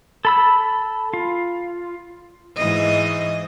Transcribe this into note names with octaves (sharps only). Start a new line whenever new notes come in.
A4 B5 E6
F4
G#2 E3 D#5